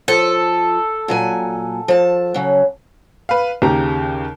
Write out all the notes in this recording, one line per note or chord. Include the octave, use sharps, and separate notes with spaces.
F3 A4
A#2 F#3 G#5
F3 A5
C#3 F#3
B4 F5
D#2 C#3 G4 A#5